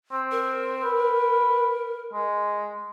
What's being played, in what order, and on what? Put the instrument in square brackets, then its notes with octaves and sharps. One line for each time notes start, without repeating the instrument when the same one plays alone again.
[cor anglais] C4
[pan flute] A#4
[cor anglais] B4
G#3